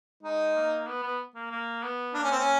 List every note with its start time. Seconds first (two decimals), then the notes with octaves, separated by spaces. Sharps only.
0.22 G#3 D#4
0.55 A#3
0.87 B3
1.03 B3
1.35 A#3
1.51 A#3
1.83 B3
2.14 A#3 D4
2.23 C#4
2.32 C4
2.39 C#4